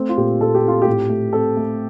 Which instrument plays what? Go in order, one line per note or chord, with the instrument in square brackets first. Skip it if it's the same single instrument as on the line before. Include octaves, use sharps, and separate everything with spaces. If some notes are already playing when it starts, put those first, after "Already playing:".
Already playing: [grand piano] A3 C4
F4
A#2 G4
A#2 A4
G4
C4 F4
G4
A2
A3
C4 A4
A3